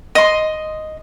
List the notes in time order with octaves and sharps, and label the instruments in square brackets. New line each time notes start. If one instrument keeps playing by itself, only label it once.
[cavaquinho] D#5 C6